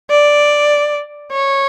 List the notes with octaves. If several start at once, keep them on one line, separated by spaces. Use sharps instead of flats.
D5
C#5